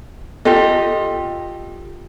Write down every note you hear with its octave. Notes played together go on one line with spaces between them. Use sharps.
F4 G4 A4 D#5